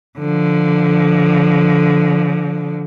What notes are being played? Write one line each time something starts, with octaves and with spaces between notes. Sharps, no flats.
D3 F3